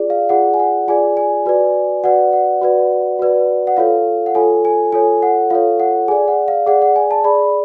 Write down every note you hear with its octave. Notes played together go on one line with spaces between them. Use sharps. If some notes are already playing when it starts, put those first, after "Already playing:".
Already playing: F4 G#4 D5
F5
F4 G#4 D5 F#5
G#5
F#5
F4 G#4 D5 G#5
G#5
F#4 B4 D5
F#4 B4 D5 F#5
F#5
F#4 B4 D5
F#4 B4 D5
F#5
F4 A4 C#5 F5
F#5
F4 A4 C#5 G#5
G#5
F4 A4 C#5 G#5
F#5
F4 A4 C#5 F5
F#5
G#4 D5 G#5
F#5
F5
G#4 D5 F#5
F#5
G#5
A5
G#4 D5 B5